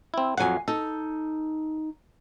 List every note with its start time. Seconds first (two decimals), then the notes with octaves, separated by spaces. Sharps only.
0.14 C4 E4
0.38 F2 F#3 F5 F#5 G#5
0.68 D#4 A4